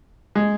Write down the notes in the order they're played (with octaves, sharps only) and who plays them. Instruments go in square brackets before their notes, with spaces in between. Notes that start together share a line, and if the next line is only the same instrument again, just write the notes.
[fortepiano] G#3